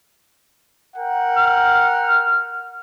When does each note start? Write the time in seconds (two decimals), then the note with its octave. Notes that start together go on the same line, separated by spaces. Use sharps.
0.97 A#4 F#5 G5
1.36 F6